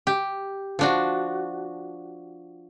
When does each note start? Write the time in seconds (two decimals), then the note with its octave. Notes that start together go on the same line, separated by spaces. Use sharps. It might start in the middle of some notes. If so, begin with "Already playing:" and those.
0.07 G4
0.79 F3 D4 F#4